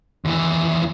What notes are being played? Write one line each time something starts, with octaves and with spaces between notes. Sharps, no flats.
D#2 E3